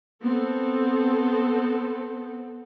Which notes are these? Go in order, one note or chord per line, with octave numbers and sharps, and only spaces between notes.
B3 C4 A4